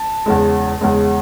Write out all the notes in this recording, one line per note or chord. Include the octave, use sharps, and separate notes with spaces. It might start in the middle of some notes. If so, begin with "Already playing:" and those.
Already playing: A5
E2 C#3 G#3
E2 C#3 G#3